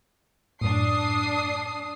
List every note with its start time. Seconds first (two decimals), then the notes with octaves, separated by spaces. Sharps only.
0.61 F#2 A2 D4 D#6 C7